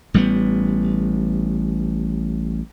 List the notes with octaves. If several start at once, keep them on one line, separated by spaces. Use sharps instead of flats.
A1 G3 A3 B3